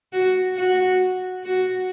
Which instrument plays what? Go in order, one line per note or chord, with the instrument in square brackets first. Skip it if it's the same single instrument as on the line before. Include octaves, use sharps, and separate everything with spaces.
[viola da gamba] F#4
F#4
F#4